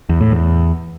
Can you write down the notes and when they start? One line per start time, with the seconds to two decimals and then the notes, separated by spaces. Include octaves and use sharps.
0.09 E2
0.21 A2
0.32 E2